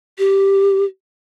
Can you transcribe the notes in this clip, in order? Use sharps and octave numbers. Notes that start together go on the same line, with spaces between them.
G4